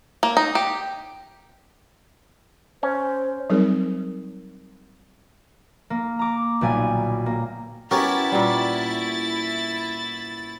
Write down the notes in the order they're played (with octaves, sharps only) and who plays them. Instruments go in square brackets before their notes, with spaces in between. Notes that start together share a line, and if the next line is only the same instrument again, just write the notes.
[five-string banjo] A#3
D#4
G4
[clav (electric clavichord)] C#4 [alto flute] C5
[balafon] F#3 G3 C4 D#4 G#4 A#4
[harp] A#3
A#5 D6
B1 A#2 G3 D5 G#5 D#7
A#3
[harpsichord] B3 C#4 F#4 [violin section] E4 A6 [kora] G4 A#4
[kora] A#2 G3